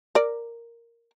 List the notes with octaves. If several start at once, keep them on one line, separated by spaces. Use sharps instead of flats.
A#4 D5